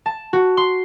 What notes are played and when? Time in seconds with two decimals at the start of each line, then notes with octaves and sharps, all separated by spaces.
0.06 A5
0.33 F#4
0.57 C6